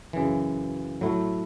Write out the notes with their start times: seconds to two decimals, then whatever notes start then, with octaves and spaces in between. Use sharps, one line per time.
0.13 F#2 C#3 E3
1.01 A2 F#3 A3 E4